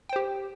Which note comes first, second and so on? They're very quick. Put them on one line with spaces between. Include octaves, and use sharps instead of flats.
G5 C5 G4